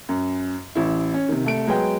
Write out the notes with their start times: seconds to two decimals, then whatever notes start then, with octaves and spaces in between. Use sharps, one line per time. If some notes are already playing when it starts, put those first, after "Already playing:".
0.09 F#2
0.75 A1 E4
1.14 C#4
1.29 C3 D#3
1.44 C2 A3 D7
1.67 F#3 G#3 B3 G5